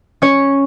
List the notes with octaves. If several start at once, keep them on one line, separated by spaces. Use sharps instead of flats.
C#4 C#5